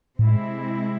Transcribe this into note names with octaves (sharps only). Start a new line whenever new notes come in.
A2 C3 G#3 C4 E4